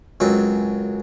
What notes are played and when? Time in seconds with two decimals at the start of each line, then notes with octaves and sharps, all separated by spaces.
0.20 C#2 F#2 C4